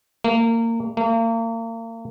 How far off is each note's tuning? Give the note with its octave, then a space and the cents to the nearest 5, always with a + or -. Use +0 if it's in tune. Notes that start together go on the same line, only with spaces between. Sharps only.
A#3 -25
A#3 -35